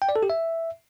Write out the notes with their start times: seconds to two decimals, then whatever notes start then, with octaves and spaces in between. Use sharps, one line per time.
0.02 G5
0.09 D5
0.16 A4
0.23 G4
0.30 E5